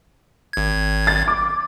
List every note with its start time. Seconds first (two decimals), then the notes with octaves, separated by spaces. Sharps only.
0.53 G#1 G#6
1.07 A6
1.28 D6